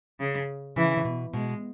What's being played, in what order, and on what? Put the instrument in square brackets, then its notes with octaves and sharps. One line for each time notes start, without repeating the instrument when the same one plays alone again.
[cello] C#3
[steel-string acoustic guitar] C#3 [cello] E3
[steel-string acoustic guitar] C#3
B2
[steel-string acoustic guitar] B2 [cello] G#3